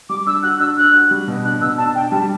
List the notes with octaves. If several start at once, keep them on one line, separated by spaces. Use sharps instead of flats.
G3 D6
D4 E6
F#4 F#6
D4 E6
D4 F#6
F#4
G3
B2
D4 F#6
B2 E6
D4 A5
D4 G5
G3 A5